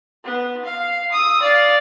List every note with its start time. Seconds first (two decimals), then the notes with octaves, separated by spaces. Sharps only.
0.24 B3
0.65 F5
1.12 D#6 E6
1.42 D5 F5